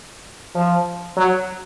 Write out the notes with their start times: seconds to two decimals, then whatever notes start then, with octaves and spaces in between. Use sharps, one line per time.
0.55 F3
1.17 F#3